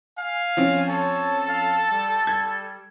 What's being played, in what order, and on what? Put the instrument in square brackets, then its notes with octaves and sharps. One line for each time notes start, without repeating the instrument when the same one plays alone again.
[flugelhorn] F5 [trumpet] G#5
[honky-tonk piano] F3 C4 C#4
[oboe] A4 [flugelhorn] C#5 [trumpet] A5
[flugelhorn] F5
G3
[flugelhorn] G3 [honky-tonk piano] G#6